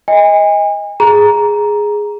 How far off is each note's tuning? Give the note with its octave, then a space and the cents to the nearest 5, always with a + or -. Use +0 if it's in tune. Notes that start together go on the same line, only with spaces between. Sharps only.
D#5 +20 G#5 -35
G#4 +0 A#5 +10